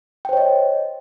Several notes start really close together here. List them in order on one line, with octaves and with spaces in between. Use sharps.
G5 C5 C#5 D#5